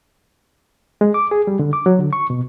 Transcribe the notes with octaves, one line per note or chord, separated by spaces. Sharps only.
G#3
D6
G#4
G3
D3
D6
F#3
D3
C#6
B2